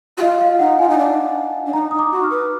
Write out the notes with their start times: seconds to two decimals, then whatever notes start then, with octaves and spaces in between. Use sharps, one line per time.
0.17 F#4
0.22 F4 D#5
0.41 F5
0.59 D#4 F#5
0.79 F4 G#5
0.89 D#4
0.98 D4
1.66 D4
1.73 D#4 A#5
1.91 D#4 D#6
1.99 D6
2.11 F#4
2.24 F6
2.30 B4